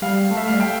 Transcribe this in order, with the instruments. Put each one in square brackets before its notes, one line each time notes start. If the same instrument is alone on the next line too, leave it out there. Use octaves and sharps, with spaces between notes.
[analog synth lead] G3 [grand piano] F5
[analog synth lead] A3
[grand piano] E5
[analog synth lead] G3 [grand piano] F5
[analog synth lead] A3 [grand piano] G5